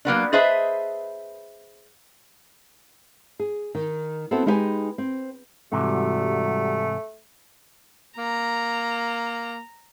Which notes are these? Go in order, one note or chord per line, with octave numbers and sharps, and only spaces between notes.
F#3 A#3 B3 D4
G#4 B4 C5 D#5 E5 A5
G#4
D#3
B3 C4 E4 F#4 A4
G#3 D#4 E4 G4 B4 G#5
C4
G#2 C3 E3 G3 A3 F#4
A#3 A#5